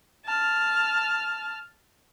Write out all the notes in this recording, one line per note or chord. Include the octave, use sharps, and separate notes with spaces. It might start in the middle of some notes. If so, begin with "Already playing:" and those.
A5 F6